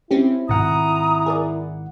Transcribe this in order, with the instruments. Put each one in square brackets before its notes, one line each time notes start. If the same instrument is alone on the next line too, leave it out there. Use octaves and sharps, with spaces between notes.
[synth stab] C4 C#4 G4 [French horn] E4
[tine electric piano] G#1 F#5 [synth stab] G#2 B2 [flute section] A#5 D#6
[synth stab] G#4 A#4 D5